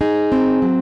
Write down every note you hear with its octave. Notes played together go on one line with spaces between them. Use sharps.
D#4 G#4
C4
F#3